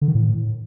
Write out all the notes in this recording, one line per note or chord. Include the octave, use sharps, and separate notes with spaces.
D3
D#3
A2